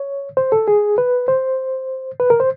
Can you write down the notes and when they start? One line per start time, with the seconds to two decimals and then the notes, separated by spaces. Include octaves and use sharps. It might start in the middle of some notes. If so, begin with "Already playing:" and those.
Already playing: C#5
0.37 C5
0.52 A4
0.68 G#4
0.98 B4
1.28 C5
2.20 B4
2.30 A#4
2.40 C5